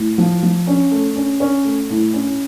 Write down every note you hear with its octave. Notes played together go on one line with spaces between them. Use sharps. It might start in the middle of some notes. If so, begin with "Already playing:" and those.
Already playing: A2
F3
F3
C#4
A3
C#4
C#4 C#5
A3
A2
C#4